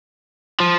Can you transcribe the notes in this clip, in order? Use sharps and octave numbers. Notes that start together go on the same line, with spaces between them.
F3